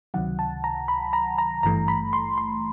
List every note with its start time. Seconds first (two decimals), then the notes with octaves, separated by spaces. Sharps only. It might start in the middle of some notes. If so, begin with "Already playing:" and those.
0.14 C#2 C3 D#3 F#3 F#5
0.39 A5
0.64 A#5
0.88 B5
1.13 A#5
1.38 A#5
1.63 G#1 G2 E3 A3 A#5
1.88 B5
2.13 C6
2.38 C6